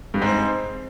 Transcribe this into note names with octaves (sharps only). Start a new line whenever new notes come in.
G2
G#2 C4